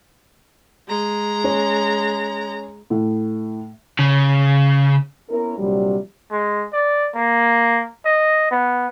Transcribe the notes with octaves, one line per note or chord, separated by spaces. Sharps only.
G#3 A#5
C#4
A2
C#3
B3 C#4 E4 A#4
A#1 C3 F#3 G3
G#3
D5
A#3
D#5
B3